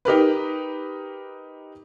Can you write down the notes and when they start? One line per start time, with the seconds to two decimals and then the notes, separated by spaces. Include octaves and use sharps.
0.05 D#4 G4 A#4 B4